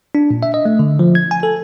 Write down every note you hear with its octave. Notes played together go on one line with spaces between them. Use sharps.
D4
A#2
E5
D#5
A3
D3
F3
G#6
G#5
A4